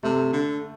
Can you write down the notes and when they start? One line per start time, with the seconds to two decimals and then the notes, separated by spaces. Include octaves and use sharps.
0.03 C3 A3
0.33 D3